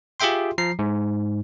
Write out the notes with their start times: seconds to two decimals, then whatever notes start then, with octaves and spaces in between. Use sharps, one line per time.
0.20 F4 G4 G#4 E5 G5 C6
0.58 F3 A#5 C7
0.79 G#2